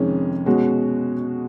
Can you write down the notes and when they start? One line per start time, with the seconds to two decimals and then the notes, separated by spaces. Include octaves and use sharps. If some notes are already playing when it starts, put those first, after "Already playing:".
Already playing: F2 C3 D#3 G#3 C#4
0.46 B2 G#3 C#4 F#4